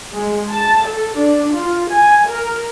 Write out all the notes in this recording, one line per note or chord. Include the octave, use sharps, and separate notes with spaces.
G#3
A5
A4
D4
F4
G#5
A#4